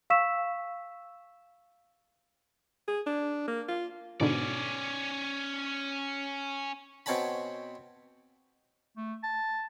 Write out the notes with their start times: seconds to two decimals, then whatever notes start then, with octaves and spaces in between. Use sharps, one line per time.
0.10 F5 C#6 E6 B6 E7
2.88 G#4
3.06 D4
3.48 A#3
3.68 F4
4.20 G#2 B2 D3 C#4 D5
7.06 B2 C4 C#5 G#5 A5 B5
8.97 A3
9.23 A5